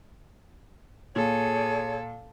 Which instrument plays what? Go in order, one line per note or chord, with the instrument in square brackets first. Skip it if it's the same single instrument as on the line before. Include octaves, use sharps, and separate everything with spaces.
[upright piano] A#2 [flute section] G#4 C#5 G#6 [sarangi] A4